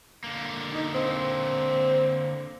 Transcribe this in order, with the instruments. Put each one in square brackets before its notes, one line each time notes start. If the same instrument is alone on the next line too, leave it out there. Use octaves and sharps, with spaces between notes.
[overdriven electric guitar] D3 A#3
[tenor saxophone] D#4
C4